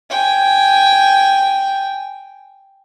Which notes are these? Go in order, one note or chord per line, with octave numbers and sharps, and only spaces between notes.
G5 G#5